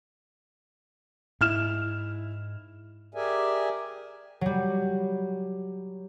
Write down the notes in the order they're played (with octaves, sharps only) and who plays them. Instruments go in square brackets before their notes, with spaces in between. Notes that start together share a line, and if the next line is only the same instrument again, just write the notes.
[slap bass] G#2 [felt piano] E4 F6 E7
[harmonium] G4 G#4 A#4 D5 E5 G#5
[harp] F#3 G3